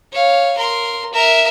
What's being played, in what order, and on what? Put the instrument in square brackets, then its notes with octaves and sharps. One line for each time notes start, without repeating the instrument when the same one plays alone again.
[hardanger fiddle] C#5 F5
A#4 C6
A#4 E5